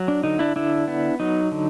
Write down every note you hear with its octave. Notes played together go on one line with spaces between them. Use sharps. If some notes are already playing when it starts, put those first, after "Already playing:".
Already playing: F#3
D4
D3 D#4
D4 E4
D3 D4 E4
B3
F#3 D#4
D3